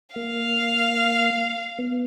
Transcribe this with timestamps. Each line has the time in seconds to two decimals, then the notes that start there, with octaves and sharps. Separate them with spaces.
0.16 A#3 F5
1.79 B3